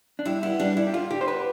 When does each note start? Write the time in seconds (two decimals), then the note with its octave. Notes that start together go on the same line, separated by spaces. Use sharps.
0.19 D4
0.25 G3 E4
0.43 B3 E4
0.60 G3 D4
0.77 G3 E4
0.87 G4
0.94 D3 F4
1.10 D3 G4
1.21 C5
1.28 B3 B4